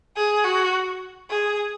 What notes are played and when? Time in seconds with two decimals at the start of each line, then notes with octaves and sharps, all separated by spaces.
0.16 G#4
0.45 F#4
1.30 G#4